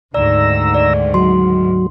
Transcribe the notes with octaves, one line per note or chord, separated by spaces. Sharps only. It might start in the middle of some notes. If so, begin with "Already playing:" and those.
D2 G#2 D#3 D5 A#5 E6
D5
F#3 C6